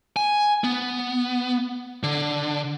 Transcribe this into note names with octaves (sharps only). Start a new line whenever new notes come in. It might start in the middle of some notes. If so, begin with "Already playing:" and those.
G#5
B3
D3